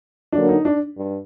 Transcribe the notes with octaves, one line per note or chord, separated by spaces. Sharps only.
D3 F#3 A#3 D4
D#4
D4
G2